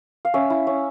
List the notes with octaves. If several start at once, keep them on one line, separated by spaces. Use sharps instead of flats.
F5
C#4 E5
E4
C#4